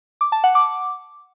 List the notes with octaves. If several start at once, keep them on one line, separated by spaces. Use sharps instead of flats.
D6
A5
F#5
D6